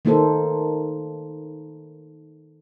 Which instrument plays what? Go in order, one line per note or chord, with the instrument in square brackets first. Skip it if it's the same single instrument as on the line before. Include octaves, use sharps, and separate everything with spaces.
[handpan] D#3 A#3 D#4 A4 C5